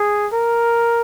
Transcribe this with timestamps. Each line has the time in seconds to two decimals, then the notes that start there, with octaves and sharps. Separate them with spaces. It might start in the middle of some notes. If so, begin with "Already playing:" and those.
Already playing: G#4
0.33 A#4